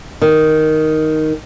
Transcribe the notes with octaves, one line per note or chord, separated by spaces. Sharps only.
D#3